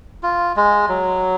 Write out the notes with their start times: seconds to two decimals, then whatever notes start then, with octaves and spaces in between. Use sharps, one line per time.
0.23 F4
0.56 G#3
0.89 F#3